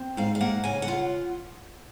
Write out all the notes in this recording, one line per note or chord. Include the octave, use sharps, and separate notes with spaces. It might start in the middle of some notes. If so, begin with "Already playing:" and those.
Already playing: C4
G#2 F5
F5
A#3 F#5
C#3 G#5
F#5
F4